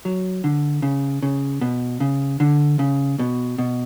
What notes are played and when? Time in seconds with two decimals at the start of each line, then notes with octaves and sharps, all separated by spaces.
0.05 F#3
0.44 D3
0.82 C#3
1.23 C#3
1.61 B2
2.00 C#3
2.40 D3
2.79 C#3
3.19 B2
3.58 B2